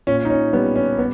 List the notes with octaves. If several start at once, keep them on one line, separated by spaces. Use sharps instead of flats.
A#2 C#4
D#4
C#4
G3 B3
C#4
B3